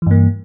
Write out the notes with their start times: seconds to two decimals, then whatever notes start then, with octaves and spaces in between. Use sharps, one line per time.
0.02 E3
0.06 G2
0.11 A#3